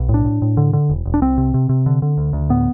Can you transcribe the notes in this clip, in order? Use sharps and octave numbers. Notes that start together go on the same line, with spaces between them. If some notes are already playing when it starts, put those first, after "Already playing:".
Already playing: B1
A2
D4
A2
A2
D3
D3
E1
E1
D4
C2 C4
C3
C3
C3
D3
D3
D2
D2
A2 B3